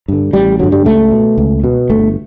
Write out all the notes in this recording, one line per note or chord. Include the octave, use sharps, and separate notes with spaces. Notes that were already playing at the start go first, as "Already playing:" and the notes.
G2 D3
A1 G3
G2 D3 F#3
G3
C#2 A3
B2
C#2
B2
G1 A3